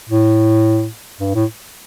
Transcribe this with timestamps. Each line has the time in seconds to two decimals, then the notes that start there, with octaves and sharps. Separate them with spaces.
0.09 A2
1.20 G2
1.35 A2